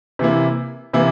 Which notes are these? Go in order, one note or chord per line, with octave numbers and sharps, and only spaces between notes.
C3 E3 A#3 E4
C3 E3 A#3 E4